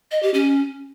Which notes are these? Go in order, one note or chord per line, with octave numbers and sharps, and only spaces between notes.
D#5
G4
C#4